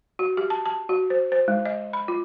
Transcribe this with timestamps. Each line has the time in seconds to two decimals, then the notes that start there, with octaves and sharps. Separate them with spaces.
0.19 F#4
0.37 G4
0.50 A5
0.66 A5
0.89 F#4
1.10 C5
1.32 C5
1.48 G#3
1.66 D#5
1.93 B5
2.08 F4